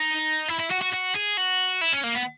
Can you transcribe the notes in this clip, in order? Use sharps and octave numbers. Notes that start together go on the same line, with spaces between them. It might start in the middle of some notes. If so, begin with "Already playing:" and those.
Already playing: D#4
E4
E4
F#4
F#4
F#4
G#4
F#4
E4
C#4
A#3
B3